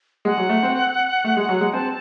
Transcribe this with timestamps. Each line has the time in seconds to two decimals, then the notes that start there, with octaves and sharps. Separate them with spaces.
0.25 G#3 F#5
0.38 F#3
0.49 A3
0.63 C4
1.24 A3
1.37 G#3
1.49 F#3
1.61 G#3
1.73 C4 A5